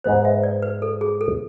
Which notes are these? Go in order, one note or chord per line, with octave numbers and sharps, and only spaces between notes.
G#2 G#3 B3 C5
E5
D5
B4
A4
G#4
A4